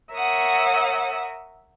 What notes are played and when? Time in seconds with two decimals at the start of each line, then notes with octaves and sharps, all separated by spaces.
0.13 A#4 C#5 E5 F#5 D#6